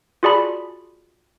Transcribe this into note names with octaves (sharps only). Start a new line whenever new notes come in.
F4 F#4 G#4 D5 A5 B5